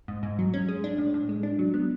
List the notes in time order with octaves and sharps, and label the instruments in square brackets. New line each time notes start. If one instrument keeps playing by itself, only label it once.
[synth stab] G#2
G#2
F#3
C#4
G#3
D4
A2
A2
G#3
D4
F#3
B3